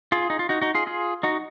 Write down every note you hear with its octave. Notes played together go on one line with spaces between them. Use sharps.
F4 G#4
D#4
F4
D#4 F#4
D#4 F#4
F4 G#4
F4 G#4
D#4 F#4